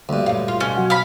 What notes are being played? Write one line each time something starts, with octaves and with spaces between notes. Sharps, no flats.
D2 G2 D3 G3 A#3
F#2 A#2 F5
F4
B2 C#4
F#3 F#4 F#5
F5 B5